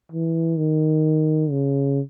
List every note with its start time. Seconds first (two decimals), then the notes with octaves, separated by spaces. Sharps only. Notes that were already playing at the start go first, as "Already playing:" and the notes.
0.12 E3
0.58 D#3
1.51 C#3